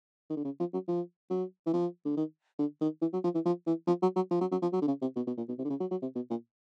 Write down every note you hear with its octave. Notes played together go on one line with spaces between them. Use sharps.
D#3
D3
C#3
F3
F#3
F3
F#3
E3
F3
D3
D#3
D3
D#3
E3
F#3
F3
E3
F3
E3
F3
F#3
F#3
F3
F#3
F#3
F3
F#3
D3
C#3
C3
B2
B2
A#2
B2
C3
D3
C#3
F#3
F#3
C3
B2
A#2